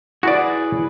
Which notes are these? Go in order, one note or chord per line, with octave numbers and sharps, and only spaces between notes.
E4 F#4 G#4 B4 D5